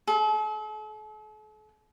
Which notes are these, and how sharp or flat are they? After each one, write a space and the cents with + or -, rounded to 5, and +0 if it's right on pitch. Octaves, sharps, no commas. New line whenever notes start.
A4 -45